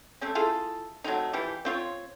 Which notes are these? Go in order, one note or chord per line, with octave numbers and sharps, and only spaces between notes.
A3 C4 C#4
E4 F4 G#4 A4
F#3 A3 C4 D#4
E3 F3 G4
C4 F4 C#5